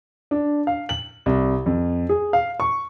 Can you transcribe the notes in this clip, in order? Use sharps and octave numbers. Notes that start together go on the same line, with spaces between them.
D4
F5
F#7
C2
F2
G#4
F5
C#6